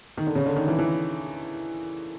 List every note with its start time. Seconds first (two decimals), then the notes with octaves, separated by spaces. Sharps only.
0.17 D#3
0.27 D3
0.35 C#3
0.46 D3
0.56 D#3
0.68 E3
0.79 E3